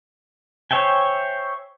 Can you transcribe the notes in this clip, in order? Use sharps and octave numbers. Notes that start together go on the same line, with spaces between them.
C5 C#5 E5 G5 G#5